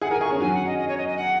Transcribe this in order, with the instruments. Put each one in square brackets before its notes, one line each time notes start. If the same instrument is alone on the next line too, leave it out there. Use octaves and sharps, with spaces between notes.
[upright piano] G#4 [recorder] F#5
[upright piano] A#4 [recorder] G#5
[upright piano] G#4 [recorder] C#6
[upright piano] C#4
[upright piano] F#3 [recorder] G#5
[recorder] F#5
D#5
D#5
C#5
D#5
D#5
F#5